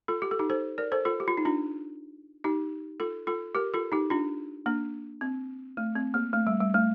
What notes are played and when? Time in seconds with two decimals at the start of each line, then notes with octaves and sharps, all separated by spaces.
0.08 F4 A4
0.22 G4
0.31 A4
0.39 D#4 G4
0.50 A4 C5
0.78 A#4 D5
0.92 A4 C5
1.05 F4 A4
1.20 G4
1.28 F4
1.37 D#4
1.45 D4 F4
2.44 D#4 G4
3.00 F4 A4
3.27 F4 A4
3.55 G4 A#4
3.74 F4 A4
3.92 D#4 G4
4.10 D4 F4
4.66 A#3 D4
5.21 C4
5.77 A3
5.96 C4
6.14 A#3
6.33 A3
6.47 G3
6.60 G3
6.74 A3